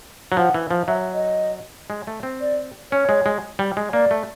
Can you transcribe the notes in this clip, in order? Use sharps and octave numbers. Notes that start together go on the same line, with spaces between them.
F#3
F3 F#5
E3
F3
F#3 E5
D#5
G#3
A3
C4
D5
C#4 C#5
G#3
G#3
G3
G#3
A#3 D5
A3